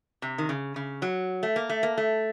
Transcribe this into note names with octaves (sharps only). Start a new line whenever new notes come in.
C3
D#3
C#3
C#3
F#3
A3
A#3
A3
A#3
A3